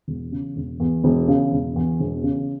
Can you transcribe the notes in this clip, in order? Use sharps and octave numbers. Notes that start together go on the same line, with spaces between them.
E1
C#3
E1
E2
E1
C#3
E1
E2
E1
C#3